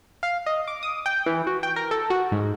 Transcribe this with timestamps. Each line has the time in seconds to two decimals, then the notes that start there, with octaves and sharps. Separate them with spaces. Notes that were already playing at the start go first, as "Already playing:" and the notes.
0.23 F5
0.46 D#5
0.68 D6
0.83 D#6
1.06 G5
1.26 E3
1.47 F#4
1.63 G5
1.76 A#4
1.91 A4
2.10 F#4
2.32 G#2